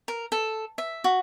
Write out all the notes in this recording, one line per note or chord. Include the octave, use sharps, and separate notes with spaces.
A#4
A4
E5
F#4